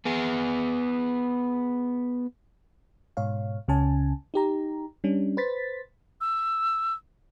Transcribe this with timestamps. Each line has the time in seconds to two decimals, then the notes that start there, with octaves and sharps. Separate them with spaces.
0.06 B3 G#4
3.17 G#2 B2 C#5 F5
3.68 C#2 C#3 C#4 G#5 A5
4.34 D#4 G4 A#5
5.04 G3 C#4 D4
5.37 B4 C5 A6 B6
6.21 E6